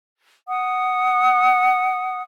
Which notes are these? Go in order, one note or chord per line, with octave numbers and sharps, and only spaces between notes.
F#5 D#6